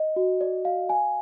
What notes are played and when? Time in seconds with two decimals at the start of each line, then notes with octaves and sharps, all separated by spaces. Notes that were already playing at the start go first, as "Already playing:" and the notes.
Already playing: D#5
0.16 F#4
0.41 D5
0.65 F5
0.89 G#5